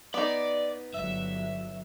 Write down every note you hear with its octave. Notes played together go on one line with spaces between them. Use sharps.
B3 D#4 D5
G1 F#3 E5